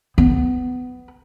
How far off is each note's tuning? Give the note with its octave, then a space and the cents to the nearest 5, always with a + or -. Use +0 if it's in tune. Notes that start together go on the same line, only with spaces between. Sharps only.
B3 +20